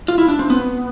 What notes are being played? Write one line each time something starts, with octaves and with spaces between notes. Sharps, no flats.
F4
E4
D4
C4
B3